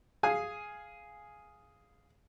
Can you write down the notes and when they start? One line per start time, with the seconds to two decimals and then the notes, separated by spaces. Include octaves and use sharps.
0.23 G#4 F5 G#5